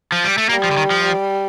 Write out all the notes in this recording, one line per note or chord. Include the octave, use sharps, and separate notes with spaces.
F3
G3
A3
G3 A#3
F3
D3
D#3
F3
G3